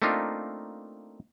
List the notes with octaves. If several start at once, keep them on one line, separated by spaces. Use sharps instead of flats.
A3 A#3 C4 D4 D#4 F4